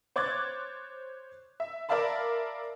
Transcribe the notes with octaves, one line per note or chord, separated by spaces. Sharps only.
C5 C#5 D6 F#6 G#6 A6
E5
A#4 D5 E5 F5 A5 B5